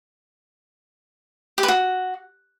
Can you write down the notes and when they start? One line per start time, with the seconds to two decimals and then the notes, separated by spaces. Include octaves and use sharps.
1.58 G4
1.63 B4
1.68 F#4